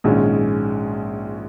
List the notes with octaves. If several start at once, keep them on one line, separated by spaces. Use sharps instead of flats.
A#1 G#2 D#3 G#3 C#4